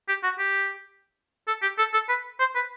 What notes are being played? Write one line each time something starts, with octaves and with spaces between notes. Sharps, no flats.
G4
F#4
G4
A4
G4
A4
A4
B4
C5
B4